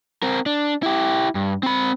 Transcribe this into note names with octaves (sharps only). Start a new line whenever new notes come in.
C4 A#4
D4
E4 G4
G2
C4 B5